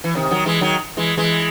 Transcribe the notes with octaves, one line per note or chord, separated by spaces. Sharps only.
E3
C3 D#3
D#3 F#3
E3 G#3
D#3 F#3
E3 G#3
E3 G#3